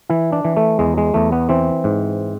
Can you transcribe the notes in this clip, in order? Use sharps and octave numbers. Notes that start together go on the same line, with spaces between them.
E3 E4
D4
E3
A3
E2 G#3
G#3
E2 A3
B3
E3 C4
G#2